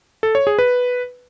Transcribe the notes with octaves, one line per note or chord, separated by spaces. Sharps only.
A4
C#5
G#4
B4